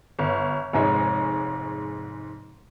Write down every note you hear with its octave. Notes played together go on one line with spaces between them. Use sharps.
G1
F1 G#2 G#3 C#5